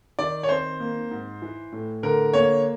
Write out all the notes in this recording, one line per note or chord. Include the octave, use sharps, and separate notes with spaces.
D#3 D5
C#5
C4 C5
A#3
G#2
E3
A2
D3 A#4
A#3 C#5